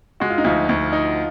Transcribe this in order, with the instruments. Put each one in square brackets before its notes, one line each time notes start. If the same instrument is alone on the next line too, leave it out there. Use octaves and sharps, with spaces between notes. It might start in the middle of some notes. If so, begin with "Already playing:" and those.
[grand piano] G#3 [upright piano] F#4
[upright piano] F4
D#4
[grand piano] D2 [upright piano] F3 F4
[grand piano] D2
D#4